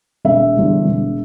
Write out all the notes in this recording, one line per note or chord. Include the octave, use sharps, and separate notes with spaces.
E1 E5
E2 D3 G3
E1